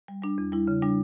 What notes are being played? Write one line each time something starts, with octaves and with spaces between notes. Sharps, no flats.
G3
G3 D4
E2
G3 E4
C#3
G3 D4